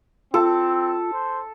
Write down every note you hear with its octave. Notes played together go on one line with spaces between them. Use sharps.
C4 F4 A4
C5